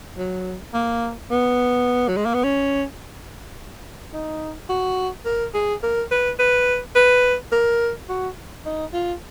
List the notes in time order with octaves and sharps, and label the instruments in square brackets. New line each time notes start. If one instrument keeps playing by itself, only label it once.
[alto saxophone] F#3
A#3
B3
F#3
G#3
A#3
B3
C#4
D#4
F#4
A#4
G#4
A#4
B4
B4
B4
A#4
F#4
D#4
F4